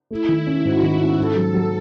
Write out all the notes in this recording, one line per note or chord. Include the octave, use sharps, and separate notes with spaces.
A3 E4
D#3
C#4
G#2 F#4
D#3
C#4
G#2 A4
F#3
F#3